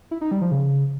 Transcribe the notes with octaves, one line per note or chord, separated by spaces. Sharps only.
E4
D#4
G3
F3
C#3